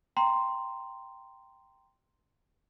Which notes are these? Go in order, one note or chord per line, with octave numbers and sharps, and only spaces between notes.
G5 A#5 C6